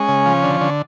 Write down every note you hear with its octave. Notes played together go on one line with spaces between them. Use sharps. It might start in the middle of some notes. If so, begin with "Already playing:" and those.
Already playing: G#3 C#4
C#3
F3
D3
D3